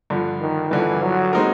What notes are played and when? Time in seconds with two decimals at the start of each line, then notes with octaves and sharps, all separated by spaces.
0.10 G2 D3 F3
0.40 D#3
0.71 G2 D3 E3 F3
1.02 F#3
1.33 G#3 C4 D#4 F#4 A#4